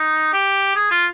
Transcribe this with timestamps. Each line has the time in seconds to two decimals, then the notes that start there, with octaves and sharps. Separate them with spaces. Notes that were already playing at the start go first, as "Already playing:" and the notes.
Already playing: D#4
0.33 G4
0.76 G#4
0.91 F4